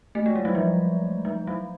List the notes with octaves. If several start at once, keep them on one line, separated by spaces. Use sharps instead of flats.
A3
G#3
G3
F#3
F3
F3
F#3